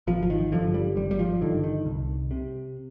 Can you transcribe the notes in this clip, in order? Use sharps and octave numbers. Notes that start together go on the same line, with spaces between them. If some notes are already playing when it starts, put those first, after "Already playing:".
G#1 F3
F3
D#3
G2 D3 F3
G3
G#1 G3
G3
F3
G2 D3 D#3
D#3
C2
C3